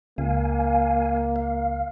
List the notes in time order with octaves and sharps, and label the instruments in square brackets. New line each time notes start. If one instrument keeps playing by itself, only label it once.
[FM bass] C#2 [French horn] A#3 [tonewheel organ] F5 G#5
[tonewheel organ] F5